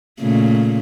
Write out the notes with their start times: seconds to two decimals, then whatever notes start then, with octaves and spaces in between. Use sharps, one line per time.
0.20 A#2 C#3 A3